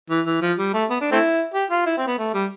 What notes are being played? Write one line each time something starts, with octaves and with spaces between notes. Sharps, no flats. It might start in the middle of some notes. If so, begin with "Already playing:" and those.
E3
E3
F3
G3
A3
B3
D4
A3 C4 E4
G4
F4
E4
C4
B3
A3
G3